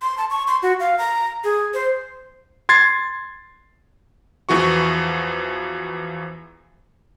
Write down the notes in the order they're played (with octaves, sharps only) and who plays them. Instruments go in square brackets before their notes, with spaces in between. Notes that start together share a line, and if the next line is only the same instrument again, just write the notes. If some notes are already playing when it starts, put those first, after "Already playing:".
[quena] C6
A5
C#6
C6
F#4
F5
A#5
G#4
C5
[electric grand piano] C6 G#6 A6 C7
E2 E3 F3 F#4 C#6